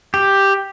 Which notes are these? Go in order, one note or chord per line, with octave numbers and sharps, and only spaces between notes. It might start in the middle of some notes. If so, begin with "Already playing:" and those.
G4